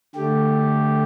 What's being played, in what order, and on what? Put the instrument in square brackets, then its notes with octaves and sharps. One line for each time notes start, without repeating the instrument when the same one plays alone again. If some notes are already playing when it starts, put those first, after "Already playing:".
[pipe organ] D3 A3 G4